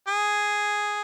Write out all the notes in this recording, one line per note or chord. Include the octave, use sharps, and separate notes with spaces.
G#4